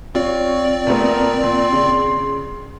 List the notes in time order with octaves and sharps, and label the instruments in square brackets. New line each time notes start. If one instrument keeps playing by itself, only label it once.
[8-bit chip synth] C4 D5 [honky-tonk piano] F4 [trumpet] C#5
[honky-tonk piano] A#2 A3 B3 [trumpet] A#4
[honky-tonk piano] A#2 [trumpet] C6
[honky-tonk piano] C#3